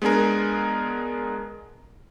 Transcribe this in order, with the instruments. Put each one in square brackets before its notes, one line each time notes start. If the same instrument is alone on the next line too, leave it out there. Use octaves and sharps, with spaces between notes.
[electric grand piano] G#3 B3 D4 G#4 A#4